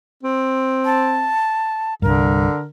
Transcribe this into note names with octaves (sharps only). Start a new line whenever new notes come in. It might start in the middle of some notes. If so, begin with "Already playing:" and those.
C4
A5
C2 G2 D3 A#4